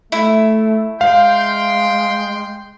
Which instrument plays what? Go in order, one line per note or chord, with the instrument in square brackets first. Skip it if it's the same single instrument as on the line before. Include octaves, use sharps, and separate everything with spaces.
[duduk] A3 [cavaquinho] E4
[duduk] G#3 [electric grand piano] F5 [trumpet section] G5 C6